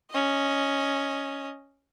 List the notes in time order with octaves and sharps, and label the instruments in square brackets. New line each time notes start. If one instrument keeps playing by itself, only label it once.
[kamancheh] C#4 D#5